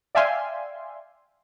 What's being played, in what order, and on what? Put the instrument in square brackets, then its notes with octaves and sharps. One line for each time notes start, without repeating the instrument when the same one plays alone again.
[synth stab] D5 E5 F5 G5 G#5 C6